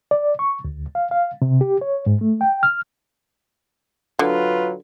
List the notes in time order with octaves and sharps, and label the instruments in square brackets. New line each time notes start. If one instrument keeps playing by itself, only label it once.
[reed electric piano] D5
C#6
D2
F5
F5
C3
G4
C#5
G#2
A3
G5
F6
[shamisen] D3 [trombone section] F#3 F4 B4